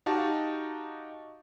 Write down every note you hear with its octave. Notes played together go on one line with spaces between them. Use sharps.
D#4 F#4 G4 F5 A5